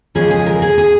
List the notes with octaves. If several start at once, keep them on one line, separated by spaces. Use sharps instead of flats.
C#3 F3 G#3 G#4
G#4
A#4
G#4
G#4